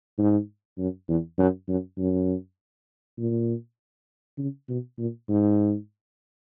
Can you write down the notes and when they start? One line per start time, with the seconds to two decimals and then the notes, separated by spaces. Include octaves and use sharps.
0.18 G#2
0.78 F#2
1.09 E2
1.38 F#2
1.68 F#2
1.98 F#2
3.18 A#2
4.38 C#3
4.69 B2
4.99 A#2
5.29 G#2